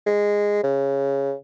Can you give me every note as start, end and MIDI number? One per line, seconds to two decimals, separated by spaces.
0.07 0.63 56
0.63 1.34 49